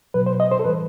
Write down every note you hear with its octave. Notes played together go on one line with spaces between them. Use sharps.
B2 F#3 B4
C5
D#5
C5
A4
A2 E3 G3 B4